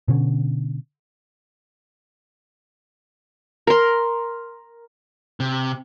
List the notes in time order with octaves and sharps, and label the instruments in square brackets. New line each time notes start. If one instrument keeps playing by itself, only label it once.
[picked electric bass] B2 D3 C#4
[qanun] A#4 C6
[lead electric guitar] C3